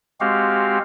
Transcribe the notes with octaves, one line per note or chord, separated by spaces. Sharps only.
G#3 C4 F#4 G4 F5